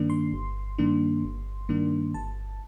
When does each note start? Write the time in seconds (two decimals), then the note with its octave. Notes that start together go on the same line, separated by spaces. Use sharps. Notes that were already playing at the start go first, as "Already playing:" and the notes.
Already playing: G2 D#3 A#3 D4
0.10 C6
0.33 G1
0.78 G2 D#3 A#3 D4
1.24 G1
1.69 G2 D#3 A#3 D4
2.14 G1 A5